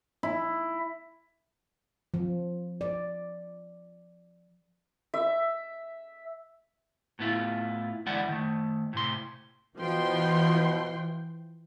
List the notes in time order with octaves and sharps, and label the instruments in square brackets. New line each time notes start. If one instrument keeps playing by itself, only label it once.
[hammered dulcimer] E4
[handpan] F3
D5
[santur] E5
[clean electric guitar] A2 B3 E4 F4
E2 D3 G#3 E4 D5 F#5
D#3 A3
A2 C3 C6
[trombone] B2 [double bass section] E3 [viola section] F3 G5 C6